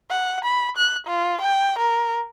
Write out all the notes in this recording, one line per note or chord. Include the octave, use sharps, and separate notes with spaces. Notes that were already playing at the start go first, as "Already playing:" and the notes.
F#5
B5
F#6
F4
G5
A#4